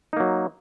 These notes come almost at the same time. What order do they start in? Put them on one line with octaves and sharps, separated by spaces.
D#4 A#3 F#3